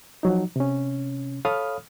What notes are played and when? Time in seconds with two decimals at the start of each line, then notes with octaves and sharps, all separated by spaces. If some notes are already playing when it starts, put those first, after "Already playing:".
0.23 F3 F#3 D#4
0.56 C3 C#4
1.45 A4 C#5 F5 B5 D#6 F6